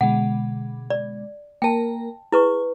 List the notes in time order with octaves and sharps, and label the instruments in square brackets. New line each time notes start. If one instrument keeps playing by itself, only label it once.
[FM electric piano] B2 D3 G#3 [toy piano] F#5
[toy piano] D5
[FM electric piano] A#3 A#4 [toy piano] G5 A5
[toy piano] E4 B4 C#6 [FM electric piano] G#4